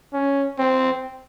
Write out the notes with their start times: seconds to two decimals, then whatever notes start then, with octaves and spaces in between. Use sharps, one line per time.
0.13 C#4
0.59 C4